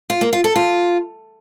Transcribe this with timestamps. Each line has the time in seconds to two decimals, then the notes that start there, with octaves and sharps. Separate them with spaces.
0.10 F4
0.21 A#3
0.33 F4
0.44 A4
0.56 F4